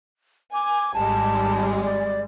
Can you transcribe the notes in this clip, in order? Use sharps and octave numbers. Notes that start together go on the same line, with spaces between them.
G#5 D6
G#1 G3 G#3 A5
D5